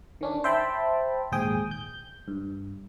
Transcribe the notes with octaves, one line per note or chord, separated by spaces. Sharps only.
D#3 C#4 D4
C5 E5 G5 A5 B5
A#1 D#2 G#2 G#4 G5 D#6
G6
G2